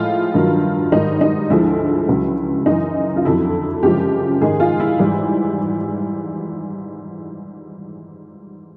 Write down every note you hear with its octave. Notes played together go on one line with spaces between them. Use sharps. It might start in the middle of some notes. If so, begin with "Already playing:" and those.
Already playing: A2 F3 G#3 F4
G2 D#3 F#3
G#2 D#3 G3 D#4
D#4
D2 D3 F3 G#3 E4
C#2 C#3 F#3
F#2 C#3 E3 D#4
F4
F2 D3 F#3 E4
F#2 C#3 F3 G#3 G4
G#2 D#3 G#3 G#4
F4
E4
G#2 E3 G3